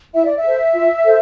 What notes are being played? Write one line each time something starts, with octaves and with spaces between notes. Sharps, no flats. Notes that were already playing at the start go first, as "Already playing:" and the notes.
E4 E5
D5
E5
A4 C5
F4
A4 C5